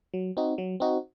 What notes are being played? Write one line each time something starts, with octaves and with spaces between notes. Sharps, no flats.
F#3
C4 D#4 F#4
F#3
C4 D#4 F#4